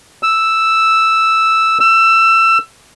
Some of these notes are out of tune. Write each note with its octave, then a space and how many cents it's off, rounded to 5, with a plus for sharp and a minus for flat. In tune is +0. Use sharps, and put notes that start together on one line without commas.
E6 +0
E6 +20